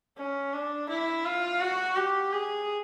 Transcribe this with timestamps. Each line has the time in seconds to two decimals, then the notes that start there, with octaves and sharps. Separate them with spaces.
0.18 C#4
0.53 D4
0.89 E4
1.25 F4
1.61 F#4
1.96 G4
2.32 G#4